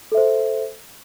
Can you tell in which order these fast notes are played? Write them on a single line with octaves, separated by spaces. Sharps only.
A4 E5 C5